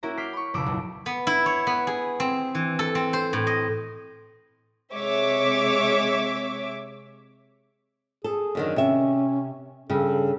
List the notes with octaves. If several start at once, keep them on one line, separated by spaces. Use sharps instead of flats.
A#3 C#4 E4 F#4 A#4
D6 F6 G6 B6 C7
B5 C#6
F1 C#2 B2 D6 E6
F#1
B3
E4
C#5
B3
G#4
C4
E3
A4
C4
C5
A2
D#5
C3 G#3 C#5 E5 D6
G#4 A4
F#2 D3 D#3
C3 C#4 E5
G2 C#3 A4